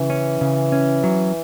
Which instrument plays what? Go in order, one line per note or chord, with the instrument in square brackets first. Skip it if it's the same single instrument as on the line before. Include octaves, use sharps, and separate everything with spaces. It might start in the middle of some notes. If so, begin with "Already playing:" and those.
Already playing: [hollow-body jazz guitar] C#3 [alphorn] E3
[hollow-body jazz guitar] C#4
C#3
C#4
F#3